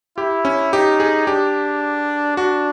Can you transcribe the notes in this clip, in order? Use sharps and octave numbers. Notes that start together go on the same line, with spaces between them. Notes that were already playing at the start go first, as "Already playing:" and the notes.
E4 G4
C#4
D#4 G4
G#4
D4 G4
D4 F#4